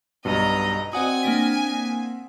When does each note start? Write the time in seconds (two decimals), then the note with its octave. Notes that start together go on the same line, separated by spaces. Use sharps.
0.25 B1 G2 B2 D#5 A#5
0.93 C4 F#4 D5 D#5 F#5 G#5 D#6
1.23 A#3 D4 B6